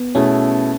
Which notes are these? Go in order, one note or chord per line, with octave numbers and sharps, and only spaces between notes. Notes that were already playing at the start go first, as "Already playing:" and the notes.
Already playing: B3
B2 A3 C#4 E4 G#4